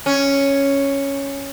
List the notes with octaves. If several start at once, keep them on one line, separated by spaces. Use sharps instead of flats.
C#4